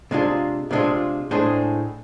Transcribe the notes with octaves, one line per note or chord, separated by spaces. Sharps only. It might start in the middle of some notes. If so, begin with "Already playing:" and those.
C3 G#3 D4 F4
C3 G#3 D4 F4
A2 G#3 D4 G#4 C5